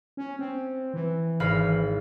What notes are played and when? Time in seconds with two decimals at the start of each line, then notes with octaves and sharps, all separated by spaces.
0.17 C#4
0.39 C4
0.94 E3
1.40 G#1 F5 B5